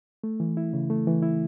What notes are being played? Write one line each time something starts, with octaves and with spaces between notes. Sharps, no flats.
A3
E3
E4
C#3
A3
E3
E4